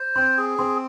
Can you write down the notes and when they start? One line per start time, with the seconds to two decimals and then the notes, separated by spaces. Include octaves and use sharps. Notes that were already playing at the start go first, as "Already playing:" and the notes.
Already playing: C5
0.16 C4 C6
0.38 G#4
0.59 C4 C6